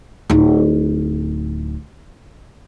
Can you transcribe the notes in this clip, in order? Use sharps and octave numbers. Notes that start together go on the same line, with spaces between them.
D1 D#4